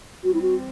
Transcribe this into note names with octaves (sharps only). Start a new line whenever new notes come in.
E3 G3 C4 F#4
E4
F#4